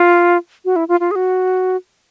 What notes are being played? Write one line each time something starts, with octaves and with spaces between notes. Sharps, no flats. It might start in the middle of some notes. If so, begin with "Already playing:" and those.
Already playing: F4
F#4
E4
F4
F4
G#4
F#4